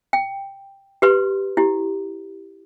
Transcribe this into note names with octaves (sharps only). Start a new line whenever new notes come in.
G5
G4 B4 C6
E4 G4